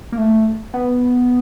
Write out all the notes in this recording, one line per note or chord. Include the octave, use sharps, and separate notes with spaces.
A#3
A3
B3